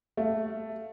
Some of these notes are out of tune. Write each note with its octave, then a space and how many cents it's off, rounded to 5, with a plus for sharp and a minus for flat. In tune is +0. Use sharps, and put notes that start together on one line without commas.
A3 +0 F5 +0